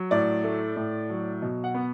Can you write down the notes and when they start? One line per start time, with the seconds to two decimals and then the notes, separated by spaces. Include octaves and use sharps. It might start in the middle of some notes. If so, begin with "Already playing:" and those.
Already playing: F#3
0.11 A2 D5
0.44 A3
0.76 A2
1.10 F#3
1.42 B2
1.64 F#5
1.75 B3